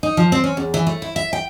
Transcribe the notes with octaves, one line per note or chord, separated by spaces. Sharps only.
D#4
F3
C4
C#4
E2
E3
A3
E4
E5
G5